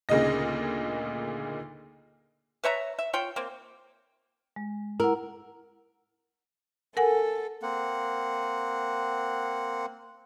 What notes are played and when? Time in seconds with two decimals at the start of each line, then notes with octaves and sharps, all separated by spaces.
0.09 D2 A#2 C#3 D#4 D#5 A#6
2.64 B4 C#5 E5 A#5
2.99 E5
3.13 F4 C#5 G5
3.36 A#3 C4
4.56 G#3
5.00 E4 A#4 F#5
6.97 A4 A#4 F#5 G#5
7.62 A#3 C4 F#5